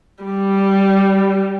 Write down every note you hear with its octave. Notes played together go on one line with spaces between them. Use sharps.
G3